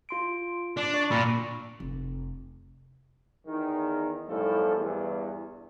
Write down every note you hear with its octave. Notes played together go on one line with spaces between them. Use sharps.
F4 C6 D7
D4
D5 C#6
A#2 B5 E6 A#6
F1
E2 D#3
B1 F#2 A2 F3 G3 A4
E2 G2 E3